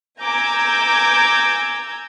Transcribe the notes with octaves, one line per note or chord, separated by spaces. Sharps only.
G#5 A#5 D6 E6 G6 G#6